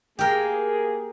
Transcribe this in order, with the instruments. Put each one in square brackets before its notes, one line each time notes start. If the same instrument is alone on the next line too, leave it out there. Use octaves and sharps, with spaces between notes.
[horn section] A#3 G#4 [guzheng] G4 A#4